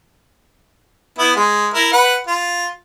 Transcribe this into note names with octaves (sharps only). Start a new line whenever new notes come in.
B3 E4
G#3
E4 A#4
B4 F#5
F4